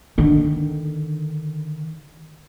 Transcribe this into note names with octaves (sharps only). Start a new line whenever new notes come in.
D3 D#3